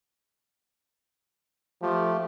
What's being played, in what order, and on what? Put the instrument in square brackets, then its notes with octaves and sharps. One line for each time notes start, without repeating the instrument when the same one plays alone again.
[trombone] F3 [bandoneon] A3 G4